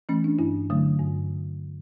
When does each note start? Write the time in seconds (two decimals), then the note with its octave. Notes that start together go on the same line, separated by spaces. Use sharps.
0.09 E3 A3 C#4
0.24 D4
0.39 G2 E4
0.70 D3 F#3 A3
1.00 G2